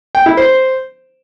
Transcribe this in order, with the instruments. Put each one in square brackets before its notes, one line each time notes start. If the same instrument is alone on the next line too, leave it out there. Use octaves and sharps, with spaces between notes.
[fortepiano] G5
E4
C5